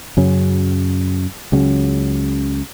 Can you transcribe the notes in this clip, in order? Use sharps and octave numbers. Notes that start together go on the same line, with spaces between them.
F#2 C#3 F#3 C#4
C#2 C#3 F#3 C#4